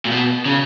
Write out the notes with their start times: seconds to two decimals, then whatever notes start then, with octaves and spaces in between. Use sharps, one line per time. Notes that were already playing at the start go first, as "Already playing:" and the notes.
0.05 A#2
0.10 B2
0.46 C#3